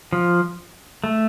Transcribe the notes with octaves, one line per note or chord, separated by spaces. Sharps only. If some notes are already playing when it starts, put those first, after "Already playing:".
F3
A3